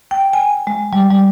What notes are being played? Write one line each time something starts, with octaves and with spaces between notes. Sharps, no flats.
G5
G#5
G#3
G3
G3